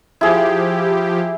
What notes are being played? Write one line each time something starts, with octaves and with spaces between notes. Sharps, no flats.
F3 E4 G4 G#4